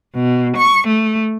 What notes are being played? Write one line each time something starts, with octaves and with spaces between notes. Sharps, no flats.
B2
C#6
A3